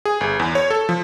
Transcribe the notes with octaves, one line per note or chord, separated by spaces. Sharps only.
G#4
G1
E2
C#5
A4
F3